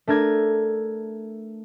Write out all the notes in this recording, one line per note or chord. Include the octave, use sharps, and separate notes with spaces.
A3 D4 A#4 G#6